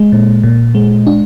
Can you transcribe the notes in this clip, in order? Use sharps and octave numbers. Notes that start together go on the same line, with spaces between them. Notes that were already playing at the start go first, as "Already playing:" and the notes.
Already playing: G#3
A#2
A#2
G#3
D4